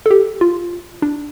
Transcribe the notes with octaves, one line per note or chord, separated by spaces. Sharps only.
A4
G4
F4
D4